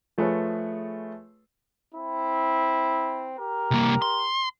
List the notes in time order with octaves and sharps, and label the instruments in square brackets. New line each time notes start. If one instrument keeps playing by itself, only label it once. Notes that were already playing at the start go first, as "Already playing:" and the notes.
[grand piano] F3 A3 G#4 B4 C#5
[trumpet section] C4 E4
G4 A#4
[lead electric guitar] C2 A#3
C6